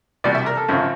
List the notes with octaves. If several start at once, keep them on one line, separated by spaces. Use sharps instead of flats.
C2 B2 G3 D5
E5
A#4
A4
G#1 F#2 C#3 F3